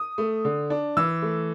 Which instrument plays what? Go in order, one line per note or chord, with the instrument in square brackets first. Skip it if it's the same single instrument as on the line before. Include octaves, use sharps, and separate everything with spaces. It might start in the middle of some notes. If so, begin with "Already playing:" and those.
Already playing: [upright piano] D#6
A3
D3
D4
E3 E6
A3